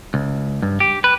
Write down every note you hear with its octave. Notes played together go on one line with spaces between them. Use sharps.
C#2
G2
G4
B4